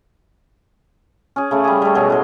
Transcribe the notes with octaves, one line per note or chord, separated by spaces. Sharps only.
C#4 G#4
C#3 A3
G3 G#4
G3 A3
B2 F#3 G#4
A2 C6